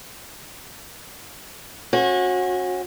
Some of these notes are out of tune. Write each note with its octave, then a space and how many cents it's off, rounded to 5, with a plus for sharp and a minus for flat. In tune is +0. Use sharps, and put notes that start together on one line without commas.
C#4 -40 F#4 -25